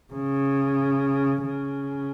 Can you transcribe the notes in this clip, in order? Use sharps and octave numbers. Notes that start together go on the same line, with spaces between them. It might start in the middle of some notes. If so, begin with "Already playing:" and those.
C#3
C#3